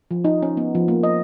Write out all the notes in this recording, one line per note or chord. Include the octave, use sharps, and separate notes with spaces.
F3
D#4
C#4
B3
F3
A#3
D#5